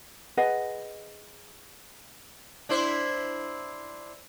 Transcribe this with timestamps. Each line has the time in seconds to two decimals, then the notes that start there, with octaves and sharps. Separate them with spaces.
0.37 G#4 B4 D#5 F#5
2.69 D4 E4 C5